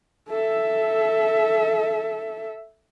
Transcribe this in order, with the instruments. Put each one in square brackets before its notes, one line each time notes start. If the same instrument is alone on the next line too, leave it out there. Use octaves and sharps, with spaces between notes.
[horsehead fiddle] A4 E5